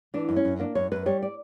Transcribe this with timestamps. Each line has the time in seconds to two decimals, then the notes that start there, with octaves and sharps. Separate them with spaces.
0.14 E3 D4
0.29 F#2
0.36 C#4
0.45 F#2
0.59 A#3 D4
0.75 F#2 C#5
0.92 F#2 B4
1.06 G3 C#5
1.22 D5